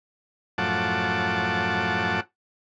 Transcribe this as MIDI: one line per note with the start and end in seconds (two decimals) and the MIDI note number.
0.58 2.20 42
0.58 2.20 45
0.58 2.20 53
0.58 2.20 78
0.58 2.20 81
0.58 2.20 86